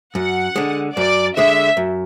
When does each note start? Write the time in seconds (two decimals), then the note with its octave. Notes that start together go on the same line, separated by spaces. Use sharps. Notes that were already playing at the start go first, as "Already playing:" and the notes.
0.15 F#2 F#5
0.56 D3 G#3
0.97 F#2 D5
1.37 D3 G#3 E5
1.77 F#2